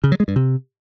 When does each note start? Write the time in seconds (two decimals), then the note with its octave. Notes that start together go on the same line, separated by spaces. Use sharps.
0.04 C#3
0.12 F#3
0.20 G#3
0.28 G2
0.36 C3